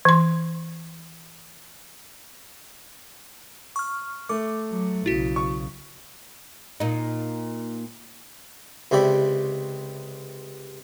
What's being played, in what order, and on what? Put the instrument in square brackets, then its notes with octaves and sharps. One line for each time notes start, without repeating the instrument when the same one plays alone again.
[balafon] E3 C6
[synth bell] C#6 F6
[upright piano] A3 [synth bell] D6
[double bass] F#3
[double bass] B1 C#3 [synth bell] E4 F#4
[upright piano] C#6
[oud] A#2 D#4
[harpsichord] C#2 C3 E4 G4 D5